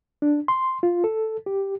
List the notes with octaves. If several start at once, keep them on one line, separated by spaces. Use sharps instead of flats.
D4
C6
F4
A4
G4